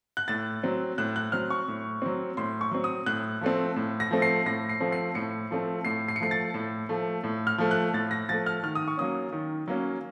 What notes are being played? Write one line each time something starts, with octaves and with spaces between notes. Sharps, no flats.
F#6
A2 A6
F#3 C4
A2 F#6
F#6
F#3 C4 F6
C#6
A2
F#3 C4
A2 C6
C#6
F#3 C4
D#6
A2 F#6
F3 A3 C4
A2
A#6
F3 A3 C4
C7
A2 A#6
C7
F3 A3 C4
C7
A2 C#7
F3 A3 C4
A2 C7
C7
C#7
F3 A3 C7
A6
A2
F3 A3
A2
F6
F3 A3
F#6
A2 A6
A#6
F3 A3 A6
F6
D#3 F6
D#6
C#6
F#3 A#3 C#4 D#6
D#3
F#3 A#3 C#4